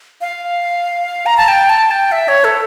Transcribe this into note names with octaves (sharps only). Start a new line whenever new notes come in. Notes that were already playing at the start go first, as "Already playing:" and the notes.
F5
A#5
A5
G5
A5
G5
E5
C#5
A4